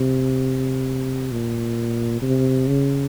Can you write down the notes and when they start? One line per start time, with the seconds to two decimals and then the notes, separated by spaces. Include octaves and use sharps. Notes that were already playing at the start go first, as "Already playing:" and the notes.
Already playing: C3
1.31 A#2
2.22 C3
2.68 C#3